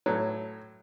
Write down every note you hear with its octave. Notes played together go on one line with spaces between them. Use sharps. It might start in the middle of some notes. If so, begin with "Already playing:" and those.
A2 F#3